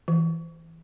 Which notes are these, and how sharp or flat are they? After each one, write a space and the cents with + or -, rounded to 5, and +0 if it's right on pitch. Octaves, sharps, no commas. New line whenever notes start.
E3 -5